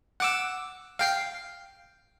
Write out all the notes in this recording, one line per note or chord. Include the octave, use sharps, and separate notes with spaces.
F#5 D6 E6
F5 G5 C7